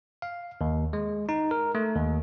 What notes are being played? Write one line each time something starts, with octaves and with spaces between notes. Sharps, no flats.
F5
D#2
G#3
D#4
A#4
A3
D#2